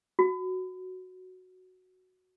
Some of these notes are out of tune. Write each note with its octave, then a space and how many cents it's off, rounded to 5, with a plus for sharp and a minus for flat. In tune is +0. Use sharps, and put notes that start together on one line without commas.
F#4 +0